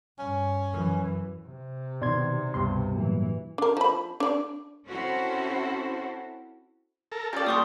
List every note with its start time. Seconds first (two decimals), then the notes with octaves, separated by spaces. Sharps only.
0.19 G2 C#4
0.72 F#2 E3
1.46 C3
2.02 B2 D#3 D5 C6 G#6
2.54 C#2 G2 B2 C6
2.95 A2 E3 F#3 A#3
3.58 D4 A#4
3.77 F3 B5
4.20 D4 D5
4.87 C4 C#4 E4 F#4 A4 C5
7.12 A4 A#4
7.33 C#4 F4 G4 A4 D5
7.47 D#2 A#2 C6 C#6 D#6